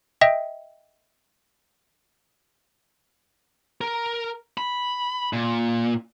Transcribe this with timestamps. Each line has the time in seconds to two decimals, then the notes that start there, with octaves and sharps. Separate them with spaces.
0.21 D#5 E5 G5
3.81 A#4
4.58 B5
5.33 A#2